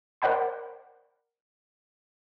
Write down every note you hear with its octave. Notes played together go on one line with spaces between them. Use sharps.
A#4 C5 D5 F#5 G5 B5